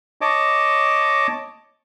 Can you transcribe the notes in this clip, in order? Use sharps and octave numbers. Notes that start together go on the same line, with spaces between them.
C#5 D#5 A5 D6